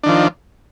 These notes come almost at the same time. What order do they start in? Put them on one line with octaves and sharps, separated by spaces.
D4 D#3 F3